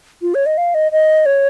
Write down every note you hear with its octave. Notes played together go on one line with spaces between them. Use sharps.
F4
C#5
D#5
F5
D#5
D#5
C#5